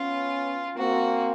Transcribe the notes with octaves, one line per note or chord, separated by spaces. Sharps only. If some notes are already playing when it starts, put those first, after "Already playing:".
Already playing: B3 C#4 F4
A#3 C4 F#4